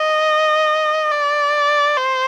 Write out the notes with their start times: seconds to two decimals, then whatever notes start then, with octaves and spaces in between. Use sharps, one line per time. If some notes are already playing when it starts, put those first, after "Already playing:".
Already playing: D#5
1.11 D5
1.97 C5